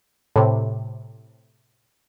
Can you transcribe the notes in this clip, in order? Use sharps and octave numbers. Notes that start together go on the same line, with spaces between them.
A2 C3